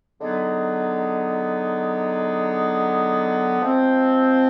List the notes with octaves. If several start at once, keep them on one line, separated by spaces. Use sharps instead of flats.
D3 F#3 B3 D#4 G#4
F3 G#3 C4